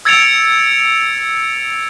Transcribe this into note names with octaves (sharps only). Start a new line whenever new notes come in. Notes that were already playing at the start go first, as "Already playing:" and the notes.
E6 G#6 A6 C#7 D7 F7